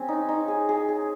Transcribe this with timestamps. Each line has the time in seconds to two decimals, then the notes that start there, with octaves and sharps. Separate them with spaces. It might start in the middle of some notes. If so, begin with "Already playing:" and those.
Already playing: C4 C#4 G#4
0.08 D#4
0.29 D#4
0.48 G#4
0.69 G#4
0.89 G#4